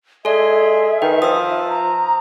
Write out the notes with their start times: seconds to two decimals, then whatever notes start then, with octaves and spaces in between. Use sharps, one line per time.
0.25 G#3 A4 D5 E5
1.02 D#3 B4
1.22 F3 D#6 E6
1.69 A#5